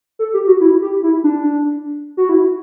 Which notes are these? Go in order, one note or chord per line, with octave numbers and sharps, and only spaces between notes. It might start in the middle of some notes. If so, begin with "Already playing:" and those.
A4
G4
F#4
E4
G4
E4
D4
F#4
E4